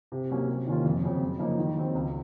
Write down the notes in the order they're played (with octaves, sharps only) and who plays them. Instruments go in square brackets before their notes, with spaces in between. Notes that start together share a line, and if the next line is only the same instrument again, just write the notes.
[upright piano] C3
F#3 A#3 C#4
C3
D#3 A#3 C#4 F4
F2
C#3 F#3 C4
F#2
C#3 F3 A#3 D#4
D#3
F#3 C4
C#2